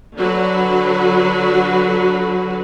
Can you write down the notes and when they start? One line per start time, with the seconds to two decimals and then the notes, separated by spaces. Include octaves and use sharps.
0.17 D3 F#3 F#4 B4